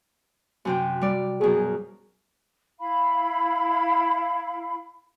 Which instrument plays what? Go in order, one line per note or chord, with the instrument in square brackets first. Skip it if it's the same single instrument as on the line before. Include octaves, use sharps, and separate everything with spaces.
[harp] F#2 C3 G5
G3 D5
[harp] F#2 B2 [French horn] G#4
[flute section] E4 F5 B5